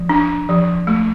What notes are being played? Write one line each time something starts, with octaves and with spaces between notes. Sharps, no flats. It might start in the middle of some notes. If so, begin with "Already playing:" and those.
Already playing: F3
D4
F3
A3